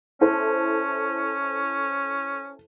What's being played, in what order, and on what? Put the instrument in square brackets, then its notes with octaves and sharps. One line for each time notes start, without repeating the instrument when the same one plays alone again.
[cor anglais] C#4 [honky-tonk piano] E4 A4 C5